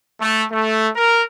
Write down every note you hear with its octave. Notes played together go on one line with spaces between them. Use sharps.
A3
A3
A#4